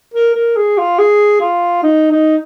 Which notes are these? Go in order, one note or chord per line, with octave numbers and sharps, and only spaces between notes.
A#4
A#4
G#4
F4
G#4
F4
D#4
D#4